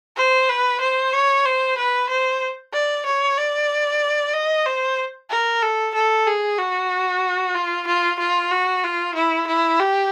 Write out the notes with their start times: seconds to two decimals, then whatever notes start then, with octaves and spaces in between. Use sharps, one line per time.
0.17 C5
0.49 B4
0.81 C5
1.13 C#5
1.45 C5
1.78 B4
2.09 C5
2.73 D5
3.06 C#5
3.38 D5
4.33 D#5
4.66 C5
5.30 A#4
5.63 A4
5.94 A4
6.27 G#4
6.58 F#4
7.54 F4
7.87 F4
8.19 F4
8.51 F#4
8.84 F4
9.15 E4
9.47 E4
9.80 G4